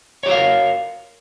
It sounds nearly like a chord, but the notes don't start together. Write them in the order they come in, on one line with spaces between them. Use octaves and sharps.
C#5 G4 F#4 F5 A#4